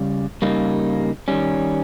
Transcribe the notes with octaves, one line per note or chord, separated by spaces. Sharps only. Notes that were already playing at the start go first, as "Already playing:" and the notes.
Already playing: C#3 G3
C#3 G3 A#3 D#4
D#3 G3 C#4